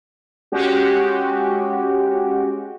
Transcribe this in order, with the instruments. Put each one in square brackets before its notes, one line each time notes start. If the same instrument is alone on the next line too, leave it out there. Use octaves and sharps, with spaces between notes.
[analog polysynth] G#3 C#4 F#4 G4